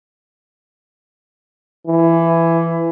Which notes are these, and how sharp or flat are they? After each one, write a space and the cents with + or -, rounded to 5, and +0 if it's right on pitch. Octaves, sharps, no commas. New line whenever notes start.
E3 +15